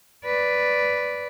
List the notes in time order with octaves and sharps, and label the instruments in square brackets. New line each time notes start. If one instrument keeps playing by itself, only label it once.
[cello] B4 D5